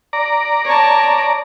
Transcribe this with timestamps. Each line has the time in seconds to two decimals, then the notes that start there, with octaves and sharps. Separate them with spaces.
0.13 D5 A#5
0.65 C#5 A5